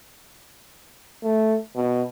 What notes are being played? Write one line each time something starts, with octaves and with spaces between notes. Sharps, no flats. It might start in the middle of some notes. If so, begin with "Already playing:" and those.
A3
B2